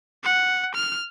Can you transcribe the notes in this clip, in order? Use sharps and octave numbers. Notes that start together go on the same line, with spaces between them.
F#5
F6